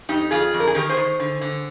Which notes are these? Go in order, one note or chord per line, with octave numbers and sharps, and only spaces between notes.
F2 D#4 G4
F2 F4 G#4
F2
A#4
G#4
D#3 G4 A#4
G#4 C5
D#3
D3
D3